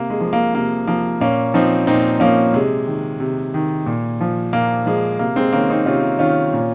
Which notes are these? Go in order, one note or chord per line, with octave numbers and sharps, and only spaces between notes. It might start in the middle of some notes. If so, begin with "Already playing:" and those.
Already playing: C3 A#3
G#3
F3
A#3
C3 A#3
F3 A#3
A#2 A#3 C#4
F3 C4 D#4
A#2 C4 D#4
F3 A#3 C#4
C3 G#3
D#3
C3
D#3
A#2
F3
A#2 A#3
F3 G#3
C3 A#3
G#3 C4
D#3 A#3 C#4
C4 D#4
C3 C#4 F4
D#3 C#4 F4
A#2